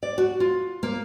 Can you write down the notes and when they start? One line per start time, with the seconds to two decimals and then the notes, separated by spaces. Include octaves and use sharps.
0.03 D5
0.18 F#4
0.40 F4
0.83 A#3